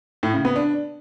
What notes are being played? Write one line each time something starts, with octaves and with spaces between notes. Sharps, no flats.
A2
C#3
B3
D4